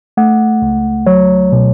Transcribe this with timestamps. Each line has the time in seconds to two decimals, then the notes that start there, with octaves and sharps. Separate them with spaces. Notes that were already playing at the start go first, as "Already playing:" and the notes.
0.17 A3 F#5
0.62 C#2
1.06 F#3 C#5
1.52 B2